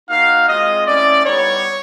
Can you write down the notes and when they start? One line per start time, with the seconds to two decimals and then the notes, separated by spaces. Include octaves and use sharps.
0.09 A#3 D#4 F#4 F5
0.49 G#3 C4 F4 D#5
0.87 A3 C#4 E4 D5
1.26 G3 B3 D#4 C#5